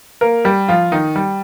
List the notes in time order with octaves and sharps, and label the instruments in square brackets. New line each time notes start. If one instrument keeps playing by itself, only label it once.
[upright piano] A#3 A#4
G3 G4
F3 F4
D#3 D#4
G3